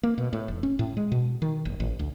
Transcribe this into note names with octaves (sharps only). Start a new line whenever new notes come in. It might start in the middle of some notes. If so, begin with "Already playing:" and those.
A#3
B2
A2
F1
C#4
A2
G#3
B2
D#3
F#1
A1
D2